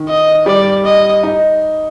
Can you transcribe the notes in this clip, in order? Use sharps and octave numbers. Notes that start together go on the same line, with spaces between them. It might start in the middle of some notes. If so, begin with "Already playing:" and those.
Already playing: D#3
D#5
G3 D5
D#5
D#4